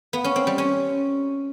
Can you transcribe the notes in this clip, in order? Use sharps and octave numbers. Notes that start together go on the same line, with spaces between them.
B3
C#4
C4
G3
C#4